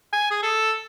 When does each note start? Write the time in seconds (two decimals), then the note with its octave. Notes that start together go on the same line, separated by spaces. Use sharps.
0.13 G#5
0.31 G#4
0.43 A4